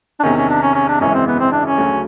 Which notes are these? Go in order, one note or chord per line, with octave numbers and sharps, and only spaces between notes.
D4
E2 C3 D#3 C#4
C#4
D4
C#4
C#4
D4
G#1 F#2 C#3 E3 G#3 C#4
C4
B3
C4
D4
C#4
D2 C#3 F#3